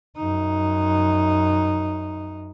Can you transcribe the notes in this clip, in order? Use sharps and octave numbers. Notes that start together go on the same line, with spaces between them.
F#2 D#4